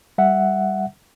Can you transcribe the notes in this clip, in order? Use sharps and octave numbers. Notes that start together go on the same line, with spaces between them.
G3 E5 F#5